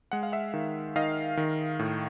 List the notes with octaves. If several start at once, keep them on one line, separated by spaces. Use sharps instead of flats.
G#3 F#5
F5
E5 F#5
D#3
D#3 D#5 F5
D#3
A2